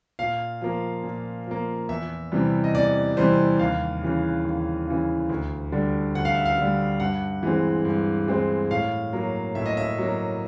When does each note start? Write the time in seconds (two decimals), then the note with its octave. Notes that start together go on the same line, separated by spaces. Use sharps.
0.19 A#2 F5
0.62 F3 A#3
1.04 A#2
1.47 F3 A#3
1.89 E2 E5
2.32 C3 E3 G3
2.64 D#5
2.74 E2 D5
3.17 C3 E3 G3 C5
3.59 D#2 F5
4.03 C#3 E3
4.45 D#2
4.87 C#3 E3
5.29 D2
5.72 D3 G3
6.15 D2 F#5
6.25 F5
6.35 E5
6.45 F5
6.58 D3 G3
7.00 G2 F#5
7.43 E3 G#3 C4
7.85 G2
8.28 E3 G#3 C4
8.70 A2 F5
9.13 F#3 A#3
9.55 A2 E5
9.66 D#5
9.77 E5
9.98 F#3 A#3